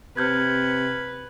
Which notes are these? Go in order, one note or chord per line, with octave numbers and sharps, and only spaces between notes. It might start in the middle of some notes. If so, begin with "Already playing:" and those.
C3 B4 F6 G6 G#6